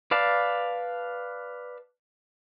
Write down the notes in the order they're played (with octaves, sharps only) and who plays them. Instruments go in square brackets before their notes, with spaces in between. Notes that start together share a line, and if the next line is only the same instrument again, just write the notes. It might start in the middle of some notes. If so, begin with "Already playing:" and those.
[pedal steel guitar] B4 D5 F5 A5